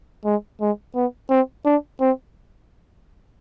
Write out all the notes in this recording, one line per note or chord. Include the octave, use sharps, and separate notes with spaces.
G#3
G#3
B3
C4
D4
C4